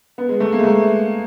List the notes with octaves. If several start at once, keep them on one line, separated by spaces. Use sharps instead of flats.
B3
G#3
A3
A#3
G#3
A3